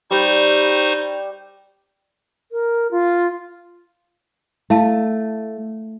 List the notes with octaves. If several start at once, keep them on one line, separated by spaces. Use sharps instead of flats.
G3 D#4 C5 D5 C#6
A#4
F4
A3 E4 F5 A5